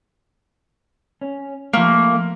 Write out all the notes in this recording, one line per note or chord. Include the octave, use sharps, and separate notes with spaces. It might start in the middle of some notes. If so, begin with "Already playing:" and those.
C#4
F3 A3 A#3